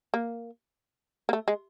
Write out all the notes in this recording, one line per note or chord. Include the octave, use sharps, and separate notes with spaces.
A#3
A#3
A3
G#3